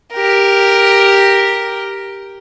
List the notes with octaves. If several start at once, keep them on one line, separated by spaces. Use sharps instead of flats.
G4 A#4